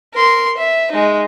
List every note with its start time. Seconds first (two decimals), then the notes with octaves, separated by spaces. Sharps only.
0.14 A#4 C6
0.57 E5
0.92 G#3 D#4